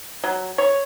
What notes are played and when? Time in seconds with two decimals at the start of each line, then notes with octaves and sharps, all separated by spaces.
0.24 F#3
0.58 C#5